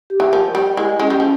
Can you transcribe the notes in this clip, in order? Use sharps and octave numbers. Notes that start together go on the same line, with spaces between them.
G4
E3
F3 A#4
G3 G4
G#3 E4
G#3 C#4
G3
F3